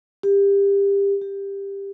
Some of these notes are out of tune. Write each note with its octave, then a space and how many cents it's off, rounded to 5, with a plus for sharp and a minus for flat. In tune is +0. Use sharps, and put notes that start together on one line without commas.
G4 +25
G4 +15